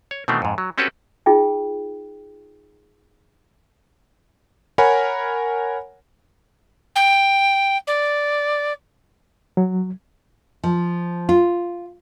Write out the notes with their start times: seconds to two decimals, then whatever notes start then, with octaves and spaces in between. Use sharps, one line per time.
0.11 C#5
0.28 B2 D#3 E3 A3 C4
0.42 F2 G#2
0.58 F#3
0.78 C4 C#4 F#4 G4 A4 B4
1.26 D#4 F4 G#4 G5
4.78 A#4 C#5 F#5 G#5 B5
6.95 G5
7.87 D5
9.57 F#3
10.64 F3
11.29 F4